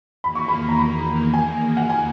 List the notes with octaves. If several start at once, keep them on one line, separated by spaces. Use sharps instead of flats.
E2 D#3 A#3 B5
C#6
B5
A#5
B5
G#5
F#5
G#5